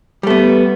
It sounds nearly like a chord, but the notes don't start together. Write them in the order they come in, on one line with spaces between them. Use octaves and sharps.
G3 A3 B3